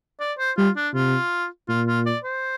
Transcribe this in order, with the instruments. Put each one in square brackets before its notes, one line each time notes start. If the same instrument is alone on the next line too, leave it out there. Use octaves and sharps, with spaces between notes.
[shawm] D5
C5
[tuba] G3 [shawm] F4
[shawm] D4
[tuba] C3 [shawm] F4
[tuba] A#2 [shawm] F4
[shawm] F4
D5
C5